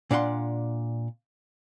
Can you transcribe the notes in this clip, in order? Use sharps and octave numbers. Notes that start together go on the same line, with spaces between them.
A#2 D4 F5 F#5 C6